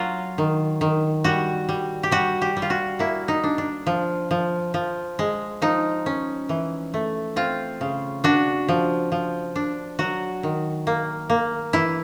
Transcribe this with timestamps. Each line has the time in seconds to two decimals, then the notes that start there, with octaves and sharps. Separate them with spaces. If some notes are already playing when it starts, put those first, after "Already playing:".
Already playing: F#3 F4
0.38 D#3
0.81 D#3
1.24 G3 F#4
1.69 G3
2.03 G4
2.11 G3 F#4
2.42 G4
2.57 G3
2.62 F4
2.70 F#4
2.99 A#3 E4
3.28 D#4
3.44 D4
3.58 D4
3.87 F3
4.31 F3
4.74 F3
5.19 G#3
5.62 F3 D#4
6.06 C#4
6.49 E3
6.94 A3
7.36 C4 F4
7.81 C#3
8.24 D4 F#4
8.68 F3
9.12 F3
9.56 D4
9.99 F#3 F#4
10.43 D#3
10.87 A#3
11.30 A#3
11.73 E3 E4